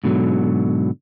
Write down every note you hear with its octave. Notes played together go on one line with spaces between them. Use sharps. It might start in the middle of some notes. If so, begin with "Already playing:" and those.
G#2 B2 D3 D#3 F#3